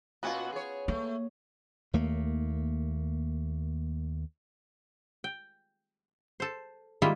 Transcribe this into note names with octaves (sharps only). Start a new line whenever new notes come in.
A#2 B3 C#4 F4 F#4
G#4 C#5
A3 A#3
D#2 A3 A#3
G5
A4 C5
D#3 G3 G#3 A#3 E4 F4